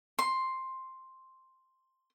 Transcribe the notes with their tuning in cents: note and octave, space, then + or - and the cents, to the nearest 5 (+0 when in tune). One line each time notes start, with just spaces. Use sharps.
C6 +5